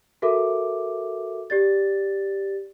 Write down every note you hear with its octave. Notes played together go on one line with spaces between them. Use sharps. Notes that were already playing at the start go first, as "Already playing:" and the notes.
F#4 A4 A#4 E5 D6
G4 D5 A6